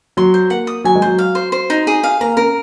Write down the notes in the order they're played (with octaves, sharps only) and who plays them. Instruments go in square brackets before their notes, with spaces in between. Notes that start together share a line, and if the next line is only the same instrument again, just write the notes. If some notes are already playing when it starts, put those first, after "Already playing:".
[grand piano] F#3 [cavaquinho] C6
[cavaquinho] C5
[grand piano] A#3 [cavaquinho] F#5
[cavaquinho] D#6
[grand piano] F#3 [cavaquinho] G#5
[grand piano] G#3
[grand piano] F#3 [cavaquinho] C5
[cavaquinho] F5
C5
C5
D#4
G#4
F5
[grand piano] A#3 [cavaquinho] A#5
[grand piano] C#4 [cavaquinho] A#4